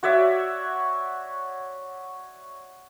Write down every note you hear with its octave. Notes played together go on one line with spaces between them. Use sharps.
F#4 C#5 D5 E5